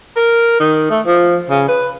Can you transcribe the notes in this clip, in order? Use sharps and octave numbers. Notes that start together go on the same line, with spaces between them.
A#4
D#3
A3
F3
C#3
B4